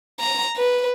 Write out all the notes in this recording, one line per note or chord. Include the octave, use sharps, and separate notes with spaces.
A#5
B4